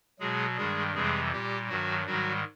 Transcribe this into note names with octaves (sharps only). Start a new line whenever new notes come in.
B2 F#3 G#3 G#4
G2 D#3 G3 G#3 G#4
F2 C3 E3 G3 G#3 G#4
A#2 G3 G4
G2 D#3 F#3 F#4
G#2 D#3 F#3 G3 F#4